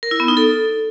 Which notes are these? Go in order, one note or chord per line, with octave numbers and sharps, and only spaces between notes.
A#4
E4
B3
D#4
A4